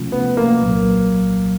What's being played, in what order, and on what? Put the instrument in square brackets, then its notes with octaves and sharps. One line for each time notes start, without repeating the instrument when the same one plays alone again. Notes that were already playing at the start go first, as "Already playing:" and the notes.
Already playing: [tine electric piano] C3 F3 A3 C#4 F4
[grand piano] B3
A#3
[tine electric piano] C2 A#2 F#3